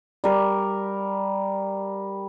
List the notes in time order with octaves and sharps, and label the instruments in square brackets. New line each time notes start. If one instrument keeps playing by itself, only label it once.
[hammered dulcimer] G3 A#4